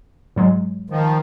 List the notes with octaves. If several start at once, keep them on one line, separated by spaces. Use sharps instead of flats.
G#2 F#3 G#3
D#3 F3